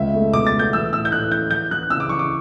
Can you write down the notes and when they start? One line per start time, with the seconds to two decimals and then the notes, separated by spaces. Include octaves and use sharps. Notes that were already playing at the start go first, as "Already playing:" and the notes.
Already playing: C#2 E5
0.14 A3
0.33 B2 D6
0.47 A6
0.53 A3
0.59 G6
0.73 E3 E6
0.92 A2 E6
1.05 G6
1.12 A2 F#6
1.31 E3 G6
1.51 E3 G6
1.71 E3 F#6
1.90 C#3 E6
2.00 D6
2.09 E3 C#6
2.19 D6